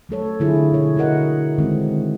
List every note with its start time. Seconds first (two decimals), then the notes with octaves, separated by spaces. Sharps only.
0.09 F#3 A3 A4 C#5
0.40 D3 F#3 E4 F4 G#4
0.72 B2 C#5
0.96 D3 E4 F#4 A#4 D#5 F#5
1.58 D#3 G#3 C4